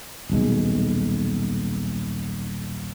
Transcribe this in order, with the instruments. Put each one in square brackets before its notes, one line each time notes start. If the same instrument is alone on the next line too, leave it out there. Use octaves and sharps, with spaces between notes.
[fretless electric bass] D#1 B1 G#3